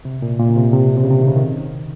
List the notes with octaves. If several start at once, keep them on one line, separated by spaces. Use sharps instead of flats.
C3
A#2
A#2
C#3
C3
C3
C3
C#3
C3
D#3
C#3
D#3